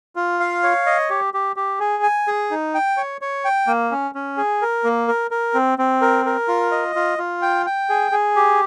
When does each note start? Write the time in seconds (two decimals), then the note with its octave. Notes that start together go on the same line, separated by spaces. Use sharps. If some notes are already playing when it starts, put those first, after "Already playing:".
0.16 F4
0.40 F5
0.63 C#5
0.86 D#5
1.10 G4
1.34 G4
1.56 G4
1.80 G#4
2.03 G#5
2.27 G#4
2.51 D#4
2.75 G5
2.97 C#5
3.21 C#5
3.45 G5
3.67 A#3
3.91 C#4
4.15 C#4
4.37 G#4
4.62 A#4
4.84 A#3
5.08 A#4
5.31 A#4
5.54 C4
5.78 C4
6.01 A#4
6.26 A#4
6.48 F4
6.71 D#5
6.95 F4
7.18 F4
7.42 G5
7.66 G5
7.89 G#4
8.12 G#4
8.36 G4